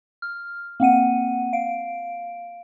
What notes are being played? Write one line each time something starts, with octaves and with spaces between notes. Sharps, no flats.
F6
A#3 C4 F#5 D#7
F5 D7